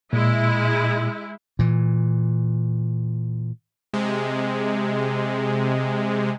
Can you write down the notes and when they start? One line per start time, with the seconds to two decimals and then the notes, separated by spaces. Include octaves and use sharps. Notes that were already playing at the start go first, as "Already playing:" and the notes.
0.13 A#2 G#3 E4
1.59 A#2 E3
3.93 C3 G#3